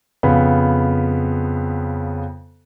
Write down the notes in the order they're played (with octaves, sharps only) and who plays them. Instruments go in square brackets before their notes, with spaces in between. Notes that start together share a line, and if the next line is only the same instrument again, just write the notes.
[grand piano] F2 C#3 B3 B5